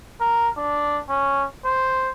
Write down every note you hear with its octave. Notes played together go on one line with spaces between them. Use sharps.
A#4
D4
C#4
C5